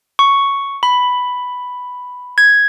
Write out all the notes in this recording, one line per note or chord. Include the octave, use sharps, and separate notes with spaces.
C#6
B5
G#6